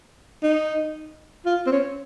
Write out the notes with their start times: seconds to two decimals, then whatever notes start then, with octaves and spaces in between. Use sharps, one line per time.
0.43 D#4
1.46 F4
1.67 C4
1.72 C#4